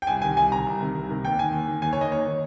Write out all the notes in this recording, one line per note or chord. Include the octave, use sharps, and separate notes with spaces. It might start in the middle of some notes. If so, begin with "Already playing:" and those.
G5
C2 G#5
C3 D#3 G#5
C2 G#5
C3 D#3 A#5
C2
C3 D#3
C2
C3 D#3
D#2 G5
D#3 G#5
D#2
D#3
D#2 G#5
C#5
D#3 D#5
D#2 C#5
D#3